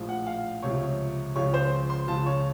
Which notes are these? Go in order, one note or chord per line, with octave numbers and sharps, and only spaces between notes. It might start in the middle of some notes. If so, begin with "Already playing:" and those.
Already playing: A#1 A2 F3
F#5
F5
C#2 C3 F3 C#5
C#2 C#3 F3 C#5
C5
C6
C#2 C#3 F3 A5
C#5